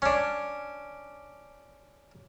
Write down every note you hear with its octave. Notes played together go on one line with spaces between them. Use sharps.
C#4 D4